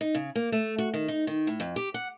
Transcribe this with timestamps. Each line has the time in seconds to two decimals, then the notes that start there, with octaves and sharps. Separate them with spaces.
0.01 D#4
0.15 C#3
0.35 A#3
0.52 A3
0.78 F#4
0.94 D#3
1.08 D#4
1.27 D#3
1.47 A2
1.60 F2
1.76 G4
1.94 F#5